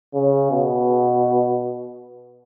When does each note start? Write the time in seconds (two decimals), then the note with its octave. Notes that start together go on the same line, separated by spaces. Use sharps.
0.15 C#3
0.51 B2